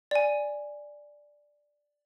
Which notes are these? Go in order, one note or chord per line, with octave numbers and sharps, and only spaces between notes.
D5 G#5